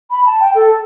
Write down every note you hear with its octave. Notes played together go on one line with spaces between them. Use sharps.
B5
A5
G5
A4